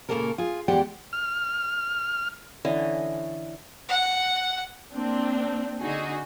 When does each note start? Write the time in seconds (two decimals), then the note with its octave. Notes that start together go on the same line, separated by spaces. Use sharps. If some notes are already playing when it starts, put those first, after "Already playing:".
0.09 A#2 C#3 E3 A#3 A4 A#4
0.38 F4 G#4
0.68 E2 G#3 G4 D5 F#5 G5
1.13 F6
2.65 D3 E3 C#4 D#5
3.88 F#5
4.93 A#3 C4 D4
5.80 D3 D#4 F#4 G#4